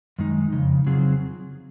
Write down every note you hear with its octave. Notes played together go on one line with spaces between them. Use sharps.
F#2 D#3 G#3 D#4
F2 C#3 D#4
C#3 F#3 C4 F4 G#4